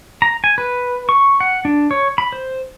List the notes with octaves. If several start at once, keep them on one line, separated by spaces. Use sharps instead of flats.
A#5
G#5
B4
C#6
F#5
D4
C#5
B5
C5